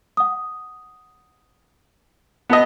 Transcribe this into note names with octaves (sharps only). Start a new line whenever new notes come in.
F#5 D#6
B3 D#5 F#5 A5